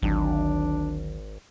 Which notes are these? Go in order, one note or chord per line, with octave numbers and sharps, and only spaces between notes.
G#1 D2 D#3 F#3 D4